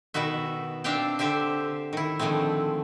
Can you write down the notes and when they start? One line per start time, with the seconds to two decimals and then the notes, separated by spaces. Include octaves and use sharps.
0.14 B2 D#3 B3 F#4 E5
0.84 C4 D4 E5 F5 G5 A5
1.19 D3 C4 G4 C5 E5
1.93 D#3 E4
2.19 D3 D#3 F3 G#3 A3 C4